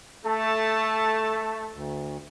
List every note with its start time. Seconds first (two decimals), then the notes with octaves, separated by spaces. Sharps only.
0.25 A3 A4 A5
1.73 D2